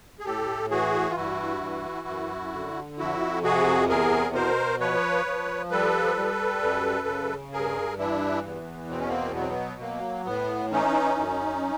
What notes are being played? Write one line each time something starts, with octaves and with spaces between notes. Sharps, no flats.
G#4
A2 G4 A4
E3 F#4 G#4
F4
G2 E4 F#4
E3
F#2
D3
F2 E4 F#4
C3 F#4 G#4
E2 G#4 A#4
B2 A#4 C5
F3 B4 C#5
F3
G3 A4 B4
G3
F#2
C#3
G2 G#4 A#4
E3 D4 E4
E2
B2 C4
C#4
A#3 C4
F#3 B3
C4
B3
F#3 A#3
A2 B3
E3 C#4 D#4
F#2